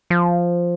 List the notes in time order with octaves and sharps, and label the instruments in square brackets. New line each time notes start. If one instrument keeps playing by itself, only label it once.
[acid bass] F3